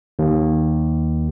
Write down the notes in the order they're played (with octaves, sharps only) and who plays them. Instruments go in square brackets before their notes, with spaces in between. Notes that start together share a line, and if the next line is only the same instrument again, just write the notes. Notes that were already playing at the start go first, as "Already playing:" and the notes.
[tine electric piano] D#2